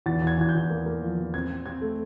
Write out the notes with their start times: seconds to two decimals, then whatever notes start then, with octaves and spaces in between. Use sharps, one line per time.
0.06 E2 A6
0.22 E2
0.27 G#6
0.38 E2 G#6
0.49 G6
0.55 E2
0.70 A#3
0.86 A#3
1.02 F3
1.18 E2
1.34 C4 G#6
1.50 C4
1.66 C4 G#6
1.81 A3